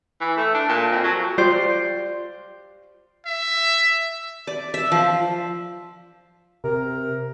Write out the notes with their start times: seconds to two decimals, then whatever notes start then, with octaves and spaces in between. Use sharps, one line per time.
0.21 E3
0.37 A3
0.54 D4
0.69 A#2
0.91 F2
1.04 F#3
1.38 F4 G4 C5 D5
3.26 E5
4.47 D5
4.74 E5
4.92 F3
6.64 C3 A#4